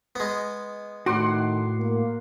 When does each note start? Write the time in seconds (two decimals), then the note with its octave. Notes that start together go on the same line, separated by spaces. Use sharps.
0.16 G#3 B3
1.06 A2 D#3 A3 F#4 F#5 C6 D6
1.78 A#3